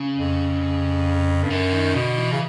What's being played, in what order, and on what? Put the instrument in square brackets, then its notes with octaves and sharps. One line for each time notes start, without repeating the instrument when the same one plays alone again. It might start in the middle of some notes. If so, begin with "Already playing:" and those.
Already playing: [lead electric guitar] C#3
[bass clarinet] F2
G2
[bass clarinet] F#2 [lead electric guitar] D3
[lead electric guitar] D#3
[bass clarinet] B2 [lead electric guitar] D3
[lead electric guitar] E3
[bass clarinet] C#3